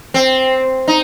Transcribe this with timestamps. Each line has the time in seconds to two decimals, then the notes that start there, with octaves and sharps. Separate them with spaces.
0.14 C4
0.88 D#4